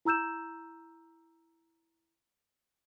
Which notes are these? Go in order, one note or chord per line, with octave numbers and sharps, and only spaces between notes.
E4 A#5 E6 G6 E7